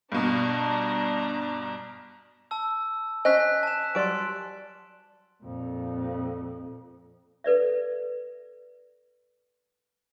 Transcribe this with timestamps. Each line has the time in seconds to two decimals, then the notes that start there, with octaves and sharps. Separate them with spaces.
0.12 G2 B2 D4 A#5
2.51 A5 E6
3.25 C#4 C5 D#5 G#5 F#6 B6
3.63 A5 E7
3.95 F#3 G3 D5 C6 D7
5.43 F2 A#2
7.44 A4 B4 D5 E5